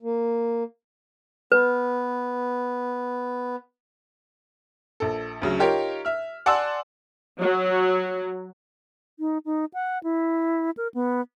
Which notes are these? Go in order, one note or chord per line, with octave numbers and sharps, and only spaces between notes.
A#3
B3 B4
A#1 A4
D2 C#3 F#3
D#4 F4 G4 A#4 C#5
E5 F6
D5 F#5 G#5 A5 C6 E6
F#3
D#4
D#4
F#5
E4
A#4
B3